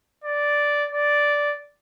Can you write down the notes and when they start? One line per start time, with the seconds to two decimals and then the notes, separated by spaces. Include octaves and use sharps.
0.24 D5
0.92 D5